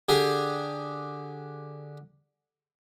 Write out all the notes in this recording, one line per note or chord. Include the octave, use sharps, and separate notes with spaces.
D3 G4 G#4